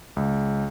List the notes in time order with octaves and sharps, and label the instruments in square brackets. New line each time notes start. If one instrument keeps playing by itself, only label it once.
[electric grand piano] C#2